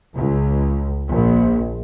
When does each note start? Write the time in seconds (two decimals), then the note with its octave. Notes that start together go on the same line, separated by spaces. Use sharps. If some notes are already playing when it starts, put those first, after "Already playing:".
0.17 C#2
1.09 A#1